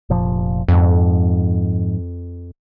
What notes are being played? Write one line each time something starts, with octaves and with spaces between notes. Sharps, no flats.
F1 A#2 F3
F2 G#2 F3